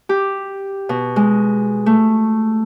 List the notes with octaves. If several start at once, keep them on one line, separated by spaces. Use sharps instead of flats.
G4
B2
G#3
A3